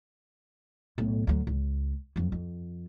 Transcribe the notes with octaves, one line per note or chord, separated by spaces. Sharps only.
B1 A2
D2 F#3
C#2
F2 F#3
F2